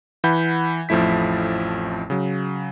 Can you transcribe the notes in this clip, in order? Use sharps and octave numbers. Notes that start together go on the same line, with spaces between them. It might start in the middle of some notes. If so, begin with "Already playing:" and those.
E3 F#5 B5 G6
A1 F2 F3 A3 E4 B6
C#3 F#3